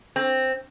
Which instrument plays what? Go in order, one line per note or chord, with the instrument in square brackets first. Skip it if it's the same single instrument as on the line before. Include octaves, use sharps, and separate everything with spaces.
[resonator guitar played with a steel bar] C4